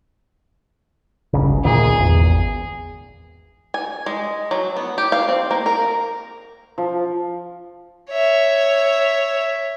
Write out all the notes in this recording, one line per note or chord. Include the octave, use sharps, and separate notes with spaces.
G1 C#2 C#3
D2 A#2 D#3 G#4
G#1 E2
G#5
G#3
F#3
B3
G4
F5
C4
A#3
A#4
F3
C#5 E5